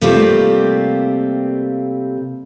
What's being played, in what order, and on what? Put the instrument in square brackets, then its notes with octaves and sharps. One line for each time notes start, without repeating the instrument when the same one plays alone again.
[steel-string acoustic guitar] C3 G3 A3 A#3 C4 F4